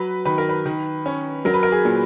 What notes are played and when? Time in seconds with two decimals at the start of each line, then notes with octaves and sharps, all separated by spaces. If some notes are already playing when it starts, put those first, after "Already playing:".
Already playing: F#3 B4
0.25 D#3 B4
0.38 A#4
0.49 B4
0.66 D#3
1.06 C#4
1.45 F#3 A#4
1.54 B4
1.63 A#4
1.72 G#4
1.85 A#2